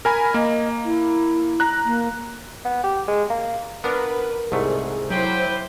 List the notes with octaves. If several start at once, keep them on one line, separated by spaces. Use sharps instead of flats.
A#4 G#5 B5
A#3 D#5
E4
A#5 F#6
A#3
B3
G4
G#3
A#3
B3 D4 A#4 B4
C2 G#2 A3 G#4
F#3 E4 G4 B4 C5 G5